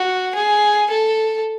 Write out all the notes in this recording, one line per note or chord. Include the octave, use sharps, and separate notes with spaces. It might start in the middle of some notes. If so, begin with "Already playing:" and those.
Already playing: F#4
G#4
A4